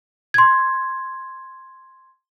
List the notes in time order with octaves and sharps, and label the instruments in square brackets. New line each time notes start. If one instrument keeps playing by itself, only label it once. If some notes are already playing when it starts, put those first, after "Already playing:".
[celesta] C6 G#6